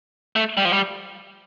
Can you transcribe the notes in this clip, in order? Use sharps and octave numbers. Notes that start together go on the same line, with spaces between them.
A3
G3
F3
G3